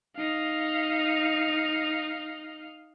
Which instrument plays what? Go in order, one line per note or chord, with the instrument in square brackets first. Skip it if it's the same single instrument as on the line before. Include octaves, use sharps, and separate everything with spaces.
[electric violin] D#4 F5